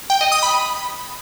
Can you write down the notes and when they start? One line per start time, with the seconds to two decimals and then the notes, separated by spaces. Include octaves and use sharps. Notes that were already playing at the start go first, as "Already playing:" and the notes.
0.10 G5
0.21 D#5
0.32 D#6
0.43 B5